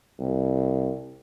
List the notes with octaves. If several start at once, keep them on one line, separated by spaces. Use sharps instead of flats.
C2